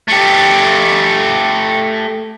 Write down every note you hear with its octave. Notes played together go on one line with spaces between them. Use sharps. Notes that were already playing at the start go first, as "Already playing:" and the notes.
A3 G4